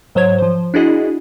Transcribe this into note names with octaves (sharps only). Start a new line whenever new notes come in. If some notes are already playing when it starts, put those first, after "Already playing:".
G#2 F#3 C5 C#5 G#6
F3 C5
D4 E4 F#4 G#4 D#5